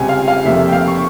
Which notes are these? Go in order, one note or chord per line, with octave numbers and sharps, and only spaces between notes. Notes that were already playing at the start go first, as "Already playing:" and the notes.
Already playing: C#2 C3 G3 G#5
F5
F5
F1 F2 C3 G3 A#3 E5
G5
F5
C#6